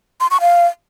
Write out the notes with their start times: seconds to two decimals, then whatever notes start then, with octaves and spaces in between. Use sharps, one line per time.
0.20 C6
0.31 C#6
0.41 F5